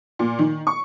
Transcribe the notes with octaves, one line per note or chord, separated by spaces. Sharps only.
A#2
D#3
C#6